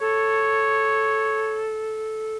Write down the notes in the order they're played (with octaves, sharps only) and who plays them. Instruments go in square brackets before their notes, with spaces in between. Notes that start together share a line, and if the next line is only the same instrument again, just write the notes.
[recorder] A4 [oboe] C#5